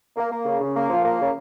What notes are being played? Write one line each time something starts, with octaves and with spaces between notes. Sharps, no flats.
A#3
A#3
C#3
C#3
A#3
F3
A#3
C#3